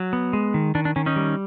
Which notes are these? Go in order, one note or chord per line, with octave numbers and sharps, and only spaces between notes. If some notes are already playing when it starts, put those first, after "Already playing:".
Already playing: F#3
B3
G#3
D#3
D#3 D4
D4
D#3 C#4
C#4 D#4
G3